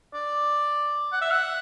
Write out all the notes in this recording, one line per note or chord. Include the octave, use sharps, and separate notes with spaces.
D5
F#5
E5
F#5